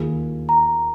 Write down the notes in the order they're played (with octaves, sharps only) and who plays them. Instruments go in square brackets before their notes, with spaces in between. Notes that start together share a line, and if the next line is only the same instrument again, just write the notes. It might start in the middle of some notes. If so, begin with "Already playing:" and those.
Already playing: [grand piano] D#2 D#3 A#3 F4 G#4
[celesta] A#5